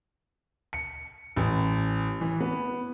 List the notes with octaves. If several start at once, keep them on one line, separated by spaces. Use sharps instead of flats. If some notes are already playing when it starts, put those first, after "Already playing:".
C#7
A1
E3
B3